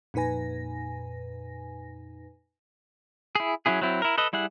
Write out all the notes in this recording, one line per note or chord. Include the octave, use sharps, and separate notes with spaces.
F2 A#2 D#4 B4 G#5 A#6
E4 G#4
F#3 C#4 E4 G#4
F#3 C4 E4
E4 A#4
A4 B4 D#5
G3 E4 G#4 F#5